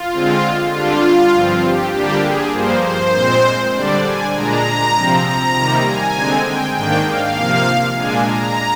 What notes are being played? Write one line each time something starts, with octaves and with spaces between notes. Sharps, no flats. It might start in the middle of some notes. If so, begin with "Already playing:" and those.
Already playing: F4
D3 G#3 C4
D3 G3 D4 F4
G2 F3 C4
G4
D3 G3 A#3 D4 G4
G#4
G2 F3 A#3 C5
C5
A#2 G#3 C4
D3 G3 D4 D5
G#5
A#2 G#3 D4 A#5
C3 F3 C4
A#5
C3 D#3 G3 A#3
G#5
D3 G#3 C4
G5
G#2 D#3 A#3 D4 G5
F5
C3 F3 A#3
A#2 G#3 D4 G#5
A#5